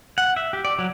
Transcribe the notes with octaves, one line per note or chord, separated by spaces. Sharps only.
F#5
E5
G4
D5
F#3